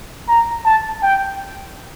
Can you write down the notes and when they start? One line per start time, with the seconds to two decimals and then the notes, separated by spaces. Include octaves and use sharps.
0.28 A#5
0.65 A5
1.02 G5